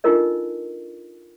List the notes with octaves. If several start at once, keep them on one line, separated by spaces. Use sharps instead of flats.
D4 D#4 F4 A4 A#4 D#5